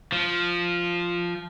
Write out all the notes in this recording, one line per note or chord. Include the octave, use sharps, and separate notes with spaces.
F3